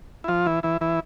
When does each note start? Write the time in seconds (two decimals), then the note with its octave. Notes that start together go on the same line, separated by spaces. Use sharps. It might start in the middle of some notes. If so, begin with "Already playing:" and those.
0.24 E4
0.28 F3 F4
0.46 E3 E4
0.63 E3 E4
0.81 E3 E4